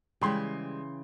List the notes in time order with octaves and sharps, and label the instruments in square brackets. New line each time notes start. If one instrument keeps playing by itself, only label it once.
[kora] C#3 E3 [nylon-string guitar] G3 G#3 G4 [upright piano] G5 C6